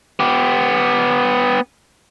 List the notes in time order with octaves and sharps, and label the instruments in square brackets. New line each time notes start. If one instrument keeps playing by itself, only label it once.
[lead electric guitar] B3 G4